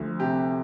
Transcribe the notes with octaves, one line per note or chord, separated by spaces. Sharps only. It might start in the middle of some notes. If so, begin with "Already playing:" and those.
Already playing: D2 F3 F#4
C3 G4